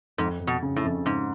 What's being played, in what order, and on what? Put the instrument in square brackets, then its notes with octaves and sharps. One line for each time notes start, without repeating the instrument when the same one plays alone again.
[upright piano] F2 [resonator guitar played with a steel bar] G#2
[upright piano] F2
[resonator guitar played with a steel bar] B2
[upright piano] C#3
[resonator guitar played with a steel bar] A2
[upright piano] F2
[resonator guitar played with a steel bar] G#2 [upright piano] C#3